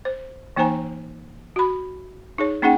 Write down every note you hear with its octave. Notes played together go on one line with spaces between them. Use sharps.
C5
E3 A#3 D#4 C5 G#5 A#5
F#4 B5
D#4 G#4 C#5
A#3 C#4 D#4 G#4 F#5 G5